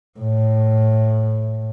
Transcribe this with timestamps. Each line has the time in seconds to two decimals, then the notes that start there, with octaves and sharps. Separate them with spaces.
0.19 A2